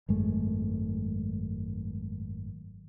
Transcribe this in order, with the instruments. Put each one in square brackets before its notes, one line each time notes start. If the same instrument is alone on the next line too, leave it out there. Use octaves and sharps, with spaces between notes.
[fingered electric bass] G#1 F#2 G#3 A3